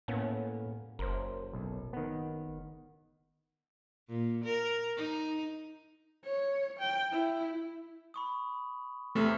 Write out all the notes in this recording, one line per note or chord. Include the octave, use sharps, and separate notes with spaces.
A2 A#3 B3 C#4
F#1 A#4 C5
B1
D#3 B3
A#2
A#4
D#4
C#5
G5
E4
B5 C#6 D#6
E2 C3 A3 C#6 F6 E7